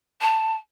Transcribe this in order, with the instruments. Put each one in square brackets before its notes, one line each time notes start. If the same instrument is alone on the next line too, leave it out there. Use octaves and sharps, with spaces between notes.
[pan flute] A5